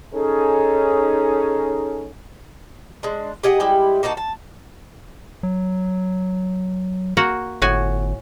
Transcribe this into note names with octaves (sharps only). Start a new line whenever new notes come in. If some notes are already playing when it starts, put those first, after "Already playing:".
C#4 D#4 G#4 A4
G#3 D4
G4 G#4 D#5 F#5
G3 G#3 E4 G4
A#3 D#4 F#4 A5
A5
F#3
A#3 F#4 F#5
G1 A2 F#4 G#5